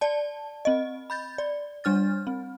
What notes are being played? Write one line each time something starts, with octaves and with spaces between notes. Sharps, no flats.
D5 A5
C4 D#5
B5 G6 A6
D5
G3 D4 F6 A6
C4